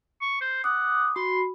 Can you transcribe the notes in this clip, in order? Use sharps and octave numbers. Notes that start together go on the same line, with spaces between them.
C#6
C5
F#5 D6 D#6
F#4 B5 C6